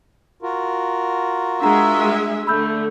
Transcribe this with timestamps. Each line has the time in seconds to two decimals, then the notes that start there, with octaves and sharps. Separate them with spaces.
0.42 F4 F#4 A#4
1.62 G#3 D4 G#4 E5 F#5 A#5
2.47 D3 A3 B5 E6 G6